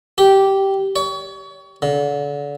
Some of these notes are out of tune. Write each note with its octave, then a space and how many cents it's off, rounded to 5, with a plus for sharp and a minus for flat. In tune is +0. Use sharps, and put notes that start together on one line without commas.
G4 -10
C#5 +35
D3 -35